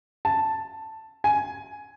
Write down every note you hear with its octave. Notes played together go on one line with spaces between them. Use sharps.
A5
G#5